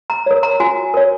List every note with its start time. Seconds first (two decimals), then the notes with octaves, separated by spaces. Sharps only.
0.10 A#5
0.26 A#4 C#5
0.43 A#5
0.60 F#4 G#5
0.94 A#4 C#5